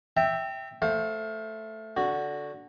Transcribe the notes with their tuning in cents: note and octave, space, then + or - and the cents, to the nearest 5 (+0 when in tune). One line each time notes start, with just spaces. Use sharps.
E5 +0 G5 +0 A#5 -40
A3 +0 C5 +0 F5 +25
D3 -10 F#4 +0